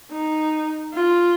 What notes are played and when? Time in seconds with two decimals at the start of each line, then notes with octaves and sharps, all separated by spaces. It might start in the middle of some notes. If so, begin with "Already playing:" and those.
0.12 D#4
0.94 F4